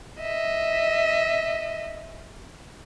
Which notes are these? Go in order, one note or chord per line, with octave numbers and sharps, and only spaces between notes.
D#5 E5